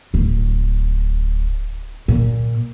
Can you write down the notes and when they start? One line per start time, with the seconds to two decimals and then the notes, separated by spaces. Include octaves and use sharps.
0.14 D1
2.08 A#2